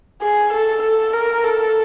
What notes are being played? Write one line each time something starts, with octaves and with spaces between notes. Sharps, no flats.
G#4
A4
A4
A#4
A4